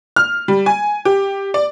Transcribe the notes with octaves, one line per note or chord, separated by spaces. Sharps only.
F6
G3
G#5
G4
D5